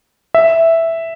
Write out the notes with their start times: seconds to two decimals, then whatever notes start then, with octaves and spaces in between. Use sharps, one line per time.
0.35 E5